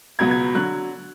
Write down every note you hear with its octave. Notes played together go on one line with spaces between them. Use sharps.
C#2 B2 F#3 B3 G#6
G#6
D3 F#3 F#6